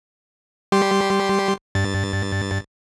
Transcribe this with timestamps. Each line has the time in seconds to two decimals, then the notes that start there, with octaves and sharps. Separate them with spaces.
0.72 G3 G4 C6
1.75 G2 A6